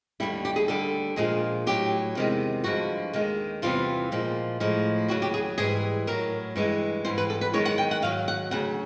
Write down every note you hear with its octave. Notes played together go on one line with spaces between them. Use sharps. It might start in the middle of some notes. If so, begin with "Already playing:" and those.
D#2 D3 G3 E4
G4
G#4
D#2 D3 G3 A4
A#2 F3 G#3 G#4
A2 F#3 G4
E2 C3 D#3 G#3
G2 D3 F3 G#3 F#4
D#2 D#3 G#3
E2 C3 E3 G3 F4
A#2 F3 G#3
A2 F3 G#3
D#2 C#3 F#3 F#4
G4
G#4
G#2 E3 G3 G#4
A2 F#3 A#4
G2 E3 G#3
G#2 E3 G3 C5
B4
A4
B4
F#2 D#3 G#3 C#5
F#5
G5
F#5
G#2 D#3 F#3 F5
F#5
D2 C#3 F#3 F#5